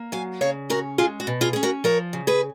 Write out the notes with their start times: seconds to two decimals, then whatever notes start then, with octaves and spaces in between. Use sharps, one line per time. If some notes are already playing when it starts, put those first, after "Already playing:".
Already playing: A#3
0.12 F#3 F5 G#5
0.41 C#3 C#5 F5
0.70 C#4 F#4 A#4
0.98 G#3 F4 G#4
1.20 F#4
1.27 B2
1.41 F4 G#4
1.53 C#4 G#4
1.63 F#4 A#4
1.84 F3 A#4 C#5
2.13 C#3
2.27 G#4 B4